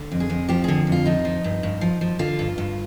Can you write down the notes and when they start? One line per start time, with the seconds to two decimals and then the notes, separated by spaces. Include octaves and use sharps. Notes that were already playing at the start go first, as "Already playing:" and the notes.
Already playing: D3
0.12 F2
0.20 G#4
0.30 F2
0.49 F3 G4
0.64 D3 G#4
0.87 F2 F4
1.06 F3 D#4
1.25 F3
1.44 G2
1.63 G2
1.81 F3
2.01 F3
2.19 D3 F4
2.39 G2
2.58 G2